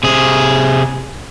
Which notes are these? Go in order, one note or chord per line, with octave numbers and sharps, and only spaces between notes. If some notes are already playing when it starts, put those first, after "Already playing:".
C3 G#4